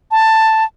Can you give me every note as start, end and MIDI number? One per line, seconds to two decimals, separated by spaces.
0.11 0.64 81